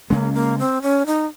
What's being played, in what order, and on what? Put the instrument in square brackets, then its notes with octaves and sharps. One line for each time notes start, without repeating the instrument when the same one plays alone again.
[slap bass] C#3 G#3 C#4 [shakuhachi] A#3
[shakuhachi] A#3
C4
C#4
D#4